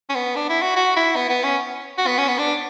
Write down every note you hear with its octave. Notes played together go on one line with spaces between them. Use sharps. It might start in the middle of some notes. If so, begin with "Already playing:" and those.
C#4
B3
D4
E4
F#4
F#4
E4
B3
B3
C#4
F#4
B3
C#4
B3
D4